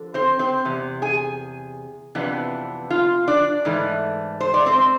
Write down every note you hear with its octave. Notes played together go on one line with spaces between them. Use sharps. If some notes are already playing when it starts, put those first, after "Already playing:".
Already playing: D3 F3
C4 C5
C4 C5
E2 C3
G#4 G#5
F2 C3 E3 B3 D4
F4 F5
D4 D5
G#2 E3 A3
C5
D5
C4 C5